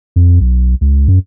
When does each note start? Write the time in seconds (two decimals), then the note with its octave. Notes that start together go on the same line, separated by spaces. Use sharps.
0.16 F2
0.41 B1
0.81 C#2
1.08 F#2